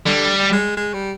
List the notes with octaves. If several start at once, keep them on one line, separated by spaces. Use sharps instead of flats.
D3 G3
G#3
G#3
G3